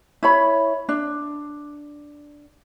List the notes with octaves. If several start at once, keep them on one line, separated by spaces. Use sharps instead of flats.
E4 C#5 B5
D4